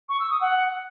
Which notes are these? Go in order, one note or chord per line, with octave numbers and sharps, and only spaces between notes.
C#6
E6
D#6
F#5